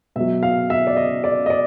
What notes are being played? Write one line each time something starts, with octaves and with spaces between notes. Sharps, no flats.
B2 F#3 E5
F5
E5
D5
D#5
D5
D#5
D5